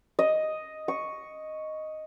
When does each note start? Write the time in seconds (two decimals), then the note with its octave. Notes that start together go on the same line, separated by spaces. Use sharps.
0.19 D#5
0.88 C#6